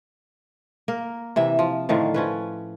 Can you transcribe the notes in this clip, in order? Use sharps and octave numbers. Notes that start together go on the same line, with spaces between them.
A#3 A#4
C3 E3 E5
F3
A2 D3 D#3 F3
F3 C#4 B4